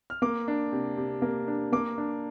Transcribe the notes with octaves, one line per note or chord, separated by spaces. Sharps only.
F6
A#3 D6
D4
C3
C3
A#3
D4
A#3 D6
D4